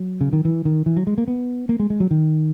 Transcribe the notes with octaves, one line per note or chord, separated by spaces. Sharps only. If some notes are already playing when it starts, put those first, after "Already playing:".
Already playing: F#3
C#3
D#3
E3
D#3
E3
F#3
G#3
A#3
B3
A#3
G#3
G#3
F#3
D#3